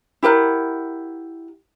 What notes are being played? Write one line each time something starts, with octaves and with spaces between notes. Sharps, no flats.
E4 G4 A#4 F#5